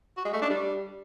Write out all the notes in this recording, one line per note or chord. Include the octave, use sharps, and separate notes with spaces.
F#4
G#3
A3
D4
G3